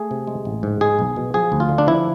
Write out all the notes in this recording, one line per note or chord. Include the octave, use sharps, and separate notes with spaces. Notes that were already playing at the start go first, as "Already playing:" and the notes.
Already playing: A3 G#4
C3
G#3
A1
G#2
G#3 G#4
B1
B2
F3 G#4
D2
F4
D3
D4
F3 E4